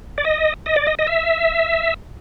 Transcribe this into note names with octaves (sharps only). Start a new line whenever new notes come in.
D5
D#5
D#5
D5
D#5
D#5
E5